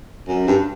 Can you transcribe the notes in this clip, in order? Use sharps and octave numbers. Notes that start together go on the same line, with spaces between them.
F#2
G2